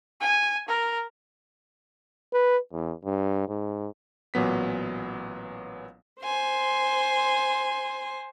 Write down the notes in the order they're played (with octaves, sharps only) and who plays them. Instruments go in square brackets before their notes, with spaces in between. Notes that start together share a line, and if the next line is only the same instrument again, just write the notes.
[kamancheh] G#5
A#4
[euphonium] B4
E2
G2
G#2
[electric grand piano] A1 A#2 F#3 B3 B6
[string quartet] C5 G#5 C6